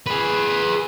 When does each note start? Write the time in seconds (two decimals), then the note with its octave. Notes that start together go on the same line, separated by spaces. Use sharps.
0.07 G#4 B4